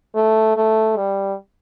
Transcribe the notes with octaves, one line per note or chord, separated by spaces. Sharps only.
A3
A3
G3